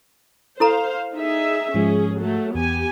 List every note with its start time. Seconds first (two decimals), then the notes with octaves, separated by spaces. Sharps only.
0.60 E4 A4 C5 F5 A#5
1.13 D#4 G#4 E5
1.74 G#2 F3 G#3 C#4 G#4
2.19 F#3 A3
2.55 E2 B3 G4 G#5